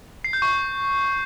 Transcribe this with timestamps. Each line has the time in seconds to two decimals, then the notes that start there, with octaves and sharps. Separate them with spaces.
0.24 C7
0.33 G6
0.42 C#6